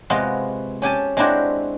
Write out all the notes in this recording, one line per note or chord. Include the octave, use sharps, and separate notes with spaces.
C3 G#3 B3 F4 F#4
C#4 G4 G#5 A5
G#3 C4 D4 E4 F#4 G4